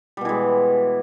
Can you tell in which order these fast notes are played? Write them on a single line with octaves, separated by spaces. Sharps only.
G3 B2 E3 G#3